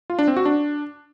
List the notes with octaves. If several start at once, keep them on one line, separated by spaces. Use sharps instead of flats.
F4
D4
C4
F#4
D4